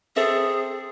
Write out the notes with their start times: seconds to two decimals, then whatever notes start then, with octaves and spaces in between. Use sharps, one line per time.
0.16 C4 G#4 A4 E5